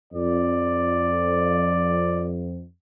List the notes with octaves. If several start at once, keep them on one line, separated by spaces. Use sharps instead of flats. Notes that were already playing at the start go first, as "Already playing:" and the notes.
F2 D5